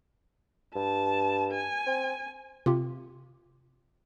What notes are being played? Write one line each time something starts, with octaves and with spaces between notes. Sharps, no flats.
G2 A5
G#5
C4
C3 F4 G4